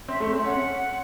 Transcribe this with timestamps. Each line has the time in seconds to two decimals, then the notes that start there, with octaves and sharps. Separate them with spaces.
0.08 C4 E5
0.20 A3
0.33 C4
0.39 E5
0.44 C#4 F#5